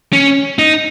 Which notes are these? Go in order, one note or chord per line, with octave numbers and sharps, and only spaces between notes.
C#4
D#4